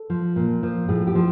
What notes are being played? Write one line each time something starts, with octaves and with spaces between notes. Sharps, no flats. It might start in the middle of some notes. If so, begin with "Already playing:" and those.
Already playing: A4
F3
A#2
F3
A2 G#4
G4
F3